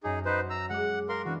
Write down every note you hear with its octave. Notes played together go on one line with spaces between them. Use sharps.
F#2 D#4 G#4 G#5 D6
D#4 F#4 B4 C5 F#5
A#5 E6
G#3 F#5 D6
A#4 F5 C6
E3 B3 D4 F#4